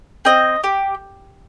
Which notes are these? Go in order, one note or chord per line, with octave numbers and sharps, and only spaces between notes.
C4 D#5
G4